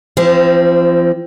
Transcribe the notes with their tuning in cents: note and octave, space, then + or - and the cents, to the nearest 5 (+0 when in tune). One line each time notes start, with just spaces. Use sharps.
F3 -35 C4 +0